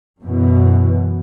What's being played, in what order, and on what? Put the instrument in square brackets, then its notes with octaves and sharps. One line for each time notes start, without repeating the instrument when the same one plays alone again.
[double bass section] F#2 B2 E3